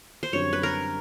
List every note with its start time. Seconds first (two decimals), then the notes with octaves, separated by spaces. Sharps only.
0.23 C5
0.33 F#2 D3 G3 C4 C#5
0.53 B4
0.63 A#4